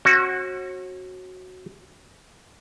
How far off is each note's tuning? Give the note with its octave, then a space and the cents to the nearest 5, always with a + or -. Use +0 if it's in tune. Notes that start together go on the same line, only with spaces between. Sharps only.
C#4 -40 F#4 +0